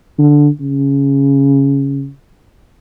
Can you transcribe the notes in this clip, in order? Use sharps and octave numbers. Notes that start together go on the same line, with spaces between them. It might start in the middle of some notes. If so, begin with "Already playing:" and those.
D3
C#3